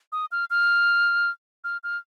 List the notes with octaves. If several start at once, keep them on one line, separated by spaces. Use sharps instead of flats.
D#6
F6
F6
F6
F6